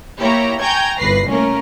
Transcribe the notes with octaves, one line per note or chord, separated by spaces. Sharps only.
A#3 E4 G4 C#5 A#5
G5 G#5 A#5 C#6 G6 G#6
G1 C2 B4 A#6 C7
A3 A#3 C#4 A#4